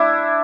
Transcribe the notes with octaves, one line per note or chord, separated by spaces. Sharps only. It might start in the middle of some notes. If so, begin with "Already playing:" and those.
Already playing: D4 E4